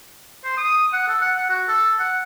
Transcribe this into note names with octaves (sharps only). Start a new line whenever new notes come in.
C5
D#6
F#5
A4
F#5
F#5
F#4
A4
F#5